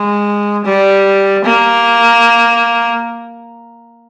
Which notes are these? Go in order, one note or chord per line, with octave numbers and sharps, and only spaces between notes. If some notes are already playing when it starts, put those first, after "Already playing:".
Already playing: G#3
G3
A#3